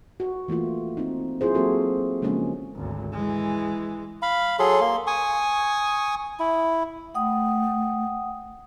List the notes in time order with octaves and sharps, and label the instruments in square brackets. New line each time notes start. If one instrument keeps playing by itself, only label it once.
[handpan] F#4
E3 A3 A#3 F4
C4 D#4
F#3 E4 F4 G#4 C5
F#3 A#3 C4 F#4 A4
C#3 F3 G#3 A#3 C#4 D4
[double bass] G#1 D2
E3 G#3
[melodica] F5 B5
F#3 G#4 A4 C6
A#3 C6
G#5 C#6 D#6
E4
[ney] A3 [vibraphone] F#5 G5 D#6